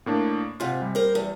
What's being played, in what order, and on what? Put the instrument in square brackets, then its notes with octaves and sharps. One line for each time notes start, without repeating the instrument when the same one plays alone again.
[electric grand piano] A2 A#3 D4
[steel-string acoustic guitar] G#2 C3 [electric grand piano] F4 F#5
[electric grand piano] G3
[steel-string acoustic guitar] A#4 C5
E2